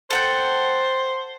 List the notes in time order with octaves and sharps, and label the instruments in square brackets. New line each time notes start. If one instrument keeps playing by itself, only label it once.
[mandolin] A4 F#5 G5 [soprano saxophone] C5